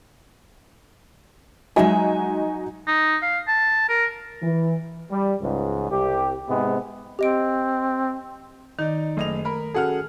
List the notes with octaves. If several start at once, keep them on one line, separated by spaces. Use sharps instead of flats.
F#3 G#3 D#4 F#4 E5 G#5
D#4
F5
A5
A#4
E3
G3
C#2 G#2
C2 G4
G#2 C3 G#3 B3
C4 G4 D#5 D7
D#3 D#4 D5
F#1 A3 D#5 F7
A#4 B5
C#4 F#4 G#4 A4 F#5 F6